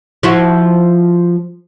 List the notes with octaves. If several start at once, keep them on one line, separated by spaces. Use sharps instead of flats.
F3 E4 F#4